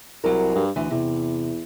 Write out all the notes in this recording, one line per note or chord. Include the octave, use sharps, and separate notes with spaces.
C2 F#3 G#4 A#4
G2
D2 E3
E2 C3